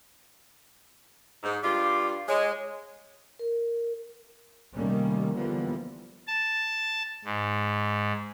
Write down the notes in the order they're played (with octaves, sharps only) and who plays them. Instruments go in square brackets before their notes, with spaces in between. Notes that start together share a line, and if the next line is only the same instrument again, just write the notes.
[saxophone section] G#2
[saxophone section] G2 G3 F4 [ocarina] D6
[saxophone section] G#3 [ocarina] C#5
[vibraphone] A#4
[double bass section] C3 D#3 G3 A3 A#3 C#4
D3 E3 F3 G3 A#3 B3
[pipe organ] A5
G#2